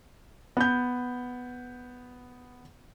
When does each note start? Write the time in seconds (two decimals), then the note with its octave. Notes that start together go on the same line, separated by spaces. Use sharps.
0.57 B3 G6